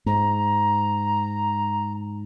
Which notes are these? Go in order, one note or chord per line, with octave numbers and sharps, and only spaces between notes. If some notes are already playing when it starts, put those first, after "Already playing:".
G#2 A#5